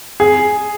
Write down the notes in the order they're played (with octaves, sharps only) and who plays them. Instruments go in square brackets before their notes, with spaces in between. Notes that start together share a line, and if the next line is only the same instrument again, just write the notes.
[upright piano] G#4